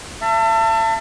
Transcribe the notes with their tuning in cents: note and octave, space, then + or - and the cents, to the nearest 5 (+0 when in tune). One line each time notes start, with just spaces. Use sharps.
E5 +35 A5 +30